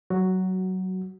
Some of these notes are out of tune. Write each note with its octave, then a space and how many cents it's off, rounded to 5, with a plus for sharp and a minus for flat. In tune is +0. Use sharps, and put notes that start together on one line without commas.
F#3 +15 F#4 +0